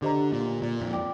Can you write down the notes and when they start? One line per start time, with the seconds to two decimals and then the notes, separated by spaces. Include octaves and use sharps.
0.02 D3 G4 C5 D#5 A#5
0.32 A#2
0.62 A#2
0.81 F2
0.91 D5 G5 D6